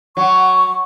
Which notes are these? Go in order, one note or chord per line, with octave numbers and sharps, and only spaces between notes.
F#3 C#6